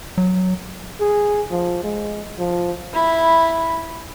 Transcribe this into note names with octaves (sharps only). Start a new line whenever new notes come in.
F#3
G#4
F3
G#3
F3
E4 B5